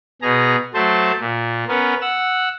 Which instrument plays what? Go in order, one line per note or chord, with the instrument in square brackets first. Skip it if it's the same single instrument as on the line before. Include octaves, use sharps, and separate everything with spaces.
[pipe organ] B2 G#4 A#5
F#3 A3 C5 A5
A#2
B3 C#4 A#4
F#5 E6